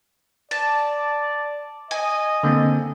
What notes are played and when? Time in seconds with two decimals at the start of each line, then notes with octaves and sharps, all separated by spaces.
0.51 D5 A5
1.91 D#5 G#5
2.43 D3 A#3 C4